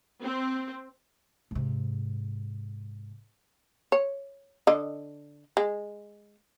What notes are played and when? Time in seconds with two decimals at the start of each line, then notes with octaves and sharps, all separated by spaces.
0.23 C4
1.51 G#2 C3
3.92 C#5
4.67 D3 D#5
5.57 G#3